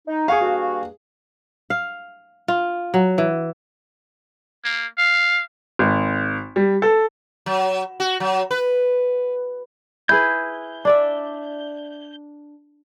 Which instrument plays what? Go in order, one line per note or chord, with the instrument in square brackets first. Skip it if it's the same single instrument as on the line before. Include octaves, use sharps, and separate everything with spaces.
[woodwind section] D#4
[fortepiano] G#4 F5 [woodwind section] F#5 G#5 C#6
[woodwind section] G2 A#3 F#4
[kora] F5
F4
F#3
E3
[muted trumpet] A#3
F5
[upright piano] G#1
G3
A4
[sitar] F#3
F#4
F#3
B4
[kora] E4 G#4 B4 [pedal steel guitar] G6
[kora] D4 D5 E5